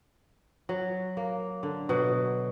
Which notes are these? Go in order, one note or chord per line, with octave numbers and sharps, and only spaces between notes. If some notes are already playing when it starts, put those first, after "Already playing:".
F#3
A#3
D3
B2 F#3